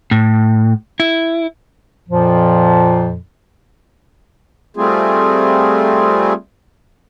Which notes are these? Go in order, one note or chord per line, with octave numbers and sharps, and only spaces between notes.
A2
E4
F2 A#2 F3
G3 A3 C4 F4 G#4